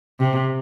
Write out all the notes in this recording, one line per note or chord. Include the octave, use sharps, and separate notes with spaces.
C3